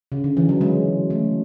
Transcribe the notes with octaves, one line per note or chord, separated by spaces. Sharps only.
C#3
D3
E3
F#3
G#3
A3